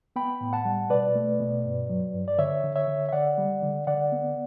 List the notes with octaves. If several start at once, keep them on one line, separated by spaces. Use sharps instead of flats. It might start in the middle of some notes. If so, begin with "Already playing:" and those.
B3 G5 B5
A2
F#5 A5
G3
B2 B4 D5
A3
B2
G2
F#3
G2
D5
D3 C#5 E5
D3
C#5 E5
D3
E5
D3 D5 F#5
G3
D3
D3 D5 F#5
B3